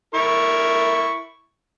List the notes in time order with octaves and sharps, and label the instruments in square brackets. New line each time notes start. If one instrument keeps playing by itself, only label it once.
[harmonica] E4 A#4 C#6